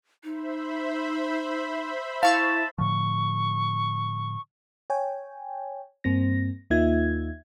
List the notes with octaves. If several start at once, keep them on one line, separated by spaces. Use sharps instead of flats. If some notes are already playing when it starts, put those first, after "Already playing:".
D#4 C5 E5 B5
E4 F5 A5 C#6 E6
A2 D3 F3 C#6
C#5 G5 G#5
G2 A#3 C4 A#6
D#2 A#3 D#4 F4 E5 G#6